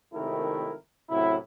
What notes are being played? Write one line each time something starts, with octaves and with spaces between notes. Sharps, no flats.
G#1 C3 D#3 A3 E4 A#4
F#2 A2 C3 F#3 E4